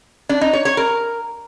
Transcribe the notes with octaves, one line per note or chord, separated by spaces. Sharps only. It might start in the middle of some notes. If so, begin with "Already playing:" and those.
D4
D#4
C#5
C#5
A#4